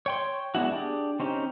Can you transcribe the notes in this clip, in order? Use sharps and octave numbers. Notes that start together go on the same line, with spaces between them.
C#5 G5 C6
G#3 B3 D4 E4 F#4
D4 G4 G#4
C4 C#4 D#4 G4